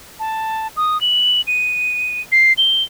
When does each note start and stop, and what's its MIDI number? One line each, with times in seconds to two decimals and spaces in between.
0.20 0.68 81
0.77 1.00 87
1.01 1.41 102
1.47 2.21 99
2.32 2.53 96
2.58 2.83 103